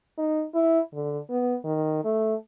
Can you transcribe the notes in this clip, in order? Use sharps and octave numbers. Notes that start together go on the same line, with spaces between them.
D#4
E4
D3
B3
D#3
A3